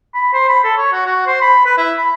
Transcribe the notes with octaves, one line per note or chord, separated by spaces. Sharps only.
B5
C5
B5
A4
C#5
F#4
F#4
C5
B5
B4
E4
B5